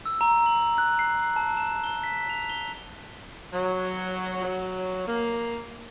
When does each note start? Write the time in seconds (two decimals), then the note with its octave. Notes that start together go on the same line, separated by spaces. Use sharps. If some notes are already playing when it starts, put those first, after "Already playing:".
0.06 E6
0.21 A#5
0.46 F#7
0.78 F#6
0.99 C7
1.22 C7
1.36 A5
1.57 E7
1.84 G7
2.04 B6
2.29 F7
2.50 G7
3.52 F#3
4.42 F#3
5.06 A#3